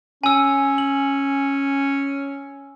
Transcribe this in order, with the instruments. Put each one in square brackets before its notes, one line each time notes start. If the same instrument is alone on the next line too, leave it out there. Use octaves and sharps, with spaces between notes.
[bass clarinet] C#4 [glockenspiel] G#5 E6
[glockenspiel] F#7